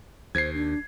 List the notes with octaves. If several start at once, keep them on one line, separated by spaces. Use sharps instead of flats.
D#2 C5 G#6 C7
D4